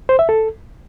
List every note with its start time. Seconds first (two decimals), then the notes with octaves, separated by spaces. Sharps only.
0.09 C5
0.19 E5
0.29 A4